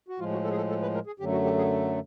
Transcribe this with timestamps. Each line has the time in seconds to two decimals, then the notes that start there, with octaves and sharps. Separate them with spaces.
0.08 F#4
0.19 A2 F3 G#3 F4
0.32 F#4
0.44 A4
0.51 G#4
0.57 A4
0.69 A4
0.82 B4
0.94 A#4
1.07 G#4
1.20 F#2 D3 F#3 A3 G4
1.32 F#4
1.44 G4
1.58 G#4